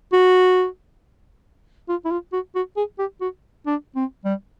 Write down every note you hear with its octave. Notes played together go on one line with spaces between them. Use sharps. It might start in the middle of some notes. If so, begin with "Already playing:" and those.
F#4
F4
E4
F4
F#4
F#4
G#4
G4
F#4
D4
C4
G3